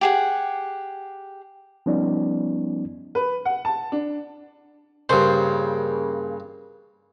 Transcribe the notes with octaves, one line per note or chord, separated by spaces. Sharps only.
G4 G#4 F#5
F3 G3 B3 C#4 D#4 D5
B4
F#5
A5
D4
G2 C#3 A#3 C5